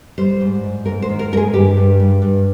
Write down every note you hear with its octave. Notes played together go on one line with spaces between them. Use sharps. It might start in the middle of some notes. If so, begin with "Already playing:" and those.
G3 C5
G#2
G#2
G#2 A#4
C5
D#3
A#4
G#2 A#4
G#4
G2 G4
G2
G2
G2